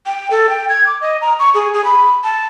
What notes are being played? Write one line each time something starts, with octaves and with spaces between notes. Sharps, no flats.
G5
A4
G5
G#6
D6
D#5
A#5
C#6
G#4
G#4
B5
A5